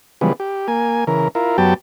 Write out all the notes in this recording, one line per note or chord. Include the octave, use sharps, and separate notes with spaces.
C#3 E3 F3 G3 G#3 B3
G4
A#3 G#5
C#3 E3 A#4
E4 F4 A#4
F#2 F#3 B3 G4 G5 A5